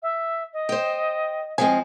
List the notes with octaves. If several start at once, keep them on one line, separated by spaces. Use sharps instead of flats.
E5
D#5
C5 G5
F3 G#3 C4 G#5